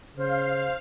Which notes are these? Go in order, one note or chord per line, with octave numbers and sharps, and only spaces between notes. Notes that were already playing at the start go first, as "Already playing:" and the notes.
C#3 C5 F5